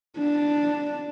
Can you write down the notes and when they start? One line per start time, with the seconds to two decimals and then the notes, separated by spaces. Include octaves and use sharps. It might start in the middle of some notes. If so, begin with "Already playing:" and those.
0.18 D4